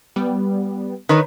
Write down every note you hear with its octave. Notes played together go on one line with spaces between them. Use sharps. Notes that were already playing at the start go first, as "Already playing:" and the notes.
G3 B3
D#3 B4 C#5